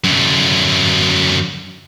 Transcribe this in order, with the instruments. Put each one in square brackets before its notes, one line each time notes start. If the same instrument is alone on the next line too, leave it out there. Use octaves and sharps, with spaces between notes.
[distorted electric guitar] F#2 D3